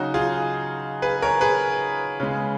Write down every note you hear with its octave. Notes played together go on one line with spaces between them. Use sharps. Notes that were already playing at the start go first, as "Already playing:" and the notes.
Already playing: C#3 F#3 D#4 F#4
F4 G#4
G#4 B4
A#4 C#5
G#4 B4
C#3 G#3